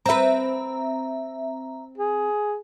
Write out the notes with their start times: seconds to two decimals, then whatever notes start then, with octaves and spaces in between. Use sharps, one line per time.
0.06 C4 B4 E5 A#5
1.98 G#4